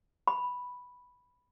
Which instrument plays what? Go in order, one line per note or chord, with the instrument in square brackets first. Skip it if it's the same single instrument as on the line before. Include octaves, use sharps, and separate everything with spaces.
[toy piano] B5